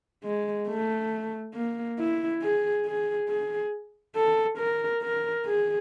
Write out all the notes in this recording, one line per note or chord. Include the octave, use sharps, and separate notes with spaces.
G#3
A3
A#3
E4
G#4
G#4
G#4
A4
A#4
A#4
G#4